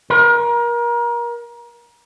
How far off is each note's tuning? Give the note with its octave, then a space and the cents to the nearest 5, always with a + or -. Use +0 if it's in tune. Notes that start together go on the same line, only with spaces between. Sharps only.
A#4 +30